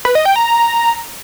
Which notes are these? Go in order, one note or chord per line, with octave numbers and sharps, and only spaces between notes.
B4
D#5
G5
A#5